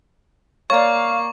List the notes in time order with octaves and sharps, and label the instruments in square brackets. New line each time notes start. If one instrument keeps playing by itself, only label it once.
[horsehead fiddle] A#3 [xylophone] C#5 D5 [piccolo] F5 [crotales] C#6